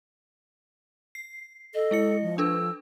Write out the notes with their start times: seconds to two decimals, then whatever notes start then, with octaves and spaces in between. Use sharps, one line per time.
1.15 C7
1.75 A4 D#5
1.91 G#3 E4 C#7
2.22 F3
2.38 D4 A4 B4 E6